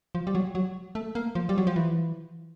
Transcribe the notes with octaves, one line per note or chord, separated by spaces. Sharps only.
F3
G3
F#3
F#3
A3
A#3
F3
G3
F#3
F3
E3